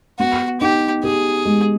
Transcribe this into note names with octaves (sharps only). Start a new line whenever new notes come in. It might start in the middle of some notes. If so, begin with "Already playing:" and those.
B3 F#4
D#4 G4
G4 G#4
G#3